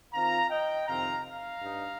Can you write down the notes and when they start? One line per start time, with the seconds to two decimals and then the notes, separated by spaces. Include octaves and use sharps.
0.13 D#3 C4 F4 F5 A#5
0.50 D#5 G5
0.87 F2 C3 D#3 C4 D#4 F5 A#5
1.24 F5 A#5
1.60 G2 G3 D#4